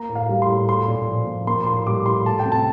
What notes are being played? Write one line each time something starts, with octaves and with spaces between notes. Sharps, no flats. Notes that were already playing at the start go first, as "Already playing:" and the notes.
Already playing: A#3 A#5
A2
F5
G3
C6
A2
A3 C6
A#2
F3
A#2
A#3 C6
A2 C6
G3 D6
A2 C6
A3 A5
G5
C3
A5